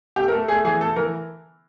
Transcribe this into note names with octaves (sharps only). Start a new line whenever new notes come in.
A3 G4
A#4
A3 A4
A3 G#4
E3 G#4
A3 A4
E3 A#4